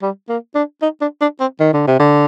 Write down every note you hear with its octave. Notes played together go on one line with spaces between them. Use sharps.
G3
A#3
D4
D#4
D4
D4
C4
D#3
D3
C3
D3